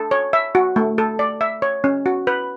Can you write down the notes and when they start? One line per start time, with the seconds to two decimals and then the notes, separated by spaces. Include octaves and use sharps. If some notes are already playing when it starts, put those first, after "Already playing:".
Already playing: A4
0.11 C#5
0.33 E5
0.55 F#4
0.76 A3
0.98 A4
1.19 D5
1.41 E5
1.62 C#5
1.84 C#4
2.06 F#4
2.27 B4